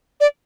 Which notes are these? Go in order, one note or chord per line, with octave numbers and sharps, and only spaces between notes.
D5